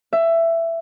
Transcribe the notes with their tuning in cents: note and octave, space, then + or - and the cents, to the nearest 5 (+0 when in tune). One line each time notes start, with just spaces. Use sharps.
E5 +15